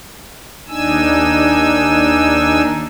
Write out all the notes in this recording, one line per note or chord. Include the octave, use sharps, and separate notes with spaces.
D#2 D4 D#4 G#5 E6